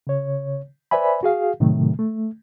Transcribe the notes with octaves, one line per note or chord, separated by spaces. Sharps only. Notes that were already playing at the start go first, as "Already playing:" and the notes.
C#3 C#5
B4 C5 D5 E5 G#5 B5
F#4 G#4 F5
A2 C3 D#3 F#3 A3
A3